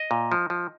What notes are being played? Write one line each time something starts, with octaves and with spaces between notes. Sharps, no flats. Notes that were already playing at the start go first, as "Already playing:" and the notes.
Already playing: D#5
A#2
F3
F3